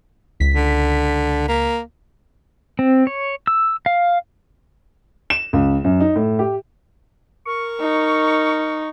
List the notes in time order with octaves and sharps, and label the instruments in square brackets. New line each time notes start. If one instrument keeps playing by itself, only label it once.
[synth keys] C#2 B6
[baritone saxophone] D3
A#3
[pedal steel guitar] C4
C#5
E6
F5
[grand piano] E7
C#2
F#2
D#4
A2
G4
[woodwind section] A#4 C#6
[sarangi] D#4